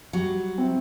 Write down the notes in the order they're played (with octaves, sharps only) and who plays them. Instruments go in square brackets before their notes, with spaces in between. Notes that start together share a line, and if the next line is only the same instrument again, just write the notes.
[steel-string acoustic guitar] F#3 [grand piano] G3
[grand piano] C4 E4